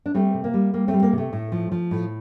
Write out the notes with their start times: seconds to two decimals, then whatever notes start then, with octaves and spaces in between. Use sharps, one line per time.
0.06 D4
0.14 G3 A3 C4
0.34 C3
0.44 A#3
0.54 G3
0.73 G3 A#3
0.88 A3 C4
0.93 G3
1.03 A#3
1.13 C3
1.18 A3
1.33 A2
1.52 F3
1.72 F3
1.91 A2